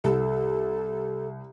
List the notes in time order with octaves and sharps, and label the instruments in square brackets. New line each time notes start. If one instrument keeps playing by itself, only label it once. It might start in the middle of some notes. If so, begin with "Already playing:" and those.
[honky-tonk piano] C2 [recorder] A4